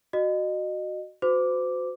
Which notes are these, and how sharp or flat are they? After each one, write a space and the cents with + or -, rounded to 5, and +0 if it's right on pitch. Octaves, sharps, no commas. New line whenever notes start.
F#4 +0 D#5 -25
F#4 -20 C5 -40 D6 -5